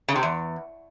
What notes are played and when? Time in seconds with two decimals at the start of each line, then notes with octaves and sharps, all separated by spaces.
0.08 C#3
0.16 C3
0.23 E2